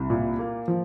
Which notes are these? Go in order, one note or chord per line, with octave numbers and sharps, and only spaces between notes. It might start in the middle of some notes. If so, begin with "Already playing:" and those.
Already playing: C2
A#2
A#3
F3